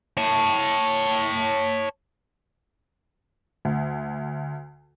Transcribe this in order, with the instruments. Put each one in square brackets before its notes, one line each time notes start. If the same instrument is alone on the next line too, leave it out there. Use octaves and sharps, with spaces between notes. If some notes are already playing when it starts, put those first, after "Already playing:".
[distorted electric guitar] C#5 A5
[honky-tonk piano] D2